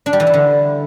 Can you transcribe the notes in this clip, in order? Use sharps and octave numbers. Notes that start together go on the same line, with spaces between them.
D4
G3
E3
E4
D3